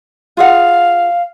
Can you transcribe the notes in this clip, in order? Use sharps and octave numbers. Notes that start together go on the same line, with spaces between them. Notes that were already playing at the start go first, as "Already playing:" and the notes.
F4 G#4 F5 F#5